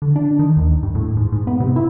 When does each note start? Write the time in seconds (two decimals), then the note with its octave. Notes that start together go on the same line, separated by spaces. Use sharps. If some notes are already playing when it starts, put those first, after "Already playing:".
0.02 D3
0.16 D4
0.39 D#3
0.57 D#2
0.83 G2
0.95 A2
1.17 G#2
1.32 G#2
1.47 B3
1.60 C3
1.76 E4